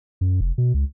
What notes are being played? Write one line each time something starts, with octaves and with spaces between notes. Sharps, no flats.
F#2
F1
B2
C#2